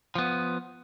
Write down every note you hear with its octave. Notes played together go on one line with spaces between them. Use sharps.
F3 B3